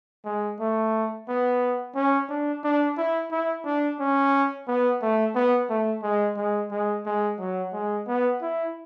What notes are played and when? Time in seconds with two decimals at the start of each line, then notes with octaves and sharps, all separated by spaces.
0.25 G#3
0.60 A3
1.28 B3
1.95 C#4
2.29 D4
2.64 D4
2.98 E4
3.31 E4
3.65 D4
4.00 C#4
4.67 B3
5.02 A3
5.35 B3
5.70 A3
6.03 G#3
6.37 G#3
6.71 G#3
7.06 G#3
7.39 F#3
7.73 G#3
8.07 B3
8.42 E4